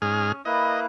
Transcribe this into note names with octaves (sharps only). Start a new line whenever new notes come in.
G#2 C#4 G#4 F6
A#3 E4 B4 D#5